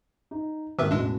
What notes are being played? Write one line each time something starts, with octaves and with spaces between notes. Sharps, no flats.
D#4
G#1 D#3 A#3 B4 E5 E6
A1 E2 B2 G#3 D4